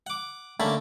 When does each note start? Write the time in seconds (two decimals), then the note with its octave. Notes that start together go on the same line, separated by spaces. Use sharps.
0.07 F#5 D6
0.60 D3 A3 A#3 C#4 A5 B5